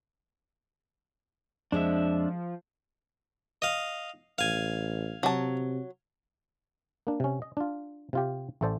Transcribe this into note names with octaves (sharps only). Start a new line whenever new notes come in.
F2 F3 G#3 D4 E5
D#5 F5
A1 F5 G#5
C3 F#3 A5
A#3 D4
C3 C#4
D#5
D4 F4
C3 F4 G4
A1 A3 A4 C5 D5 A5